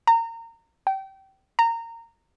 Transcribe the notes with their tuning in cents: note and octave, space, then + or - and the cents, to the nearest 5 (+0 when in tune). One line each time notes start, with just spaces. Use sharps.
A#5 -25
G5 -25
A#5 -20